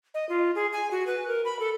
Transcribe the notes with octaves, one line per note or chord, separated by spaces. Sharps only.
D#5
F4
G#4
G#5
F#4
B4
A#4
B5
A4